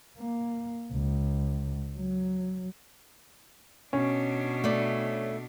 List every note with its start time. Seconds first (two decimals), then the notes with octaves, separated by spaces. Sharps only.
0.18 A#3
0.92 C#2
1.97 F#3
3.93 B2 C#4 D4
4.64 A3 D5